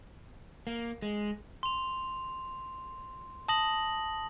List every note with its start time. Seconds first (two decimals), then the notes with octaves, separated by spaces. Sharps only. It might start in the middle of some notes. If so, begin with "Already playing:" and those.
0.67 A#3
1.02 G#3
1.63 C6 F7
3.48 A5 D#6 A#6 F#7